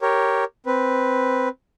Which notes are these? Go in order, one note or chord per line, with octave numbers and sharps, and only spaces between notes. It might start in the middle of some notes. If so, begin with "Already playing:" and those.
G4 A#4 C#5
C4 B4